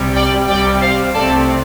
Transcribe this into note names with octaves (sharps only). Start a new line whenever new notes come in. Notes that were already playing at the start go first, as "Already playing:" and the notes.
Already playing: C2 C3 G3
D5 G5
C2 C3 G3 D5 G5
C5 F5
C2 C3 A3 C4 A4 D5